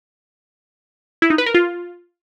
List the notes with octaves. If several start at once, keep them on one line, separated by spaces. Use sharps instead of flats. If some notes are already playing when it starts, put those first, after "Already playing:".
E4
D#4
B4
A#4
F4